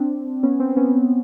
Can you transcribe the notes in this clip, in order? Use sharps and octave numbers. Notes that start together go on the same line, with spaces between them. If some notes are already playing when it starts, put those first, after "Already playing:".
Already playing: C4 D4
B3 C#4
C4
B3 C#4